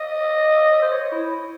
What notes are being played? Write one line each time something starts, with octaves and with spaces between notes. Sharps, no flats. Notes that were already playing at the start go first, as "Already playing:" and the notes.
Already playing: D#5
C5
C#5
E4